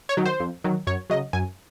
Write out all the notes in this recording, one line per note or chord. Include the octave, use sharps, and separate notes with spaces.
C#5
D#3 F#3
C5
F2
D#3 F#3
F#2 C#5
C#3 F#3 D#5
F#2 G#5